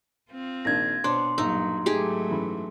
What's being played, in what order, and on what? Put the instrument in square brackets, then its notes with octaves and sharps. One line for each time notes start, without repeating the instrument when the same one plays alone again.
[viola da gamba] C4 F4
[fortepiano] A#1 D#3 D4 [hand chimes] G#6 A#6
[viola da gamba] B2 B3 [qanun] D4 [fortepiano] C5 C#5 [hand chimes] C6
[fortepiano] A#1 E6 [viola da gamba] G2 F#3 [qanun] D#4
[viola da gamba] G#2 F#3 A3 [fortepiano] D#4 [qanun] G4 G#4
[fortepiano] F#2 E3 B5